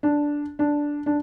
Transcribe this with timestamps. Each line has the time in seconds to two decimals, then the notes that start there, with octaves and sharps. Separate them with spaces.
0.03 D4
0.59 D4
1.06 D4